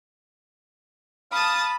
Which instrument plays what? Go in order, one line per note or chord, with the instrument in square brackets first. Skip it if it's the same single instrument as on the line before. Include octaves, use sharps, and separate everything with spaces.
[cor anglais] F5 [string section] A5 [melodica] B5 [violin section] D#6 A6